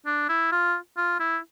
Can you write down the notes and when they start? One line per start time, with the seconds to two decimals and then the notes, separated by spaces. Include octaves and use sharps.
0.06 D4
0.29 E4
0.52 F4
0.97 F4
1.19 E4